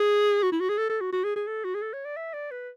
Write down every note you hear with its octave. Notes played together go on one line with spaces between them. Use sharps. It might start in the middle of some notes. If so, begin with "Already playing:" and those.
Already playing: G#4
F#4
E4
F#4
G#4
A4
A4
F#4
F#4
G#4
G#4
A4
F#4
G#4
A4
C#5
D5
E5
D5
B4